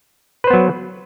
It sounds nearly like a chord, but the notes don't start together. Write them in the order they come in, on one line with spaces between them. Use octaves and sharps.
B4 C5 B3 F#3